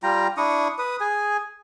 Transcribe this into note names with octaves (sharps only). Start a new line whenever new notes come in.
G3 F4 G5 A#5
D4 E4 C#6 D#6
B4 D#6
G#4 G#5